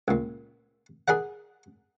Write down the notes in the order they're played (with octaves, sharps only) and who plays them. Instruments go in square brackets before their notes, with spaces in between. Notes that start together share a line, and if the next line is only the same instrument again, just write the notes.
[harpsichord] C#2 A#2
G#4 A#4 D5 F#5